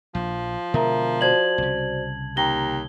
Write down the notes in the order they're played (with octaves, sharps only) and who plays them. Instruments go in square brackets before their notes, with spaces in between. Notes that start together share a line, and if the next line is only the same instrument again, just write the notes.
[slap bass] A#1 [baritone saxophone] F3
[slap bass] B2 D3 G#3 [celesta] A#4 E5 A#5
[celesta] F#4 C5 D5 [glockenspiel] A5 G#6 F#7
[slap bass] C2 C#3
[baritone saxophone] D#2 [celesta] G5 A#5 A#6 [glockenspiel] G7